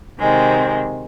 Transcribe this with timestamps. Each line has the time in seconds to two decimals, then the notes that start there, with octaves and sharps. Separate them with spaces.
0.19 C3 D#3 G#3 C4